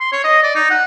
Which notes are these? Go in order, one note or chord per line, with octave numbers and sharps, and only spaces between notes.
C6
C#5
D#5
D5
D#4
F#5